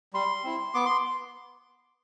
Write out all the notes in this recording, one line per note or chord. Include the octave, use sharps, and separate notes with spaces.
G3 C6
C4 E4
B3 D6
C6